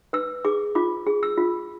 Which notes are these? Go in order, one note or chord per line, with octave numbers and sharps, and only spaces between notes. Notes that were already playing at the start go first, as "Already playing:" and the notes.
B4 E6
G#4 D6
F4 D6
G#4
E6
F4